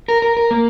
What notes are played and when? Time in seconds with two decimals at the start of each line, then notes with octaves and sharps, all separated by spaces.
0.08 A#4
0.22 A#4
0.37 A#4
0.51 A#3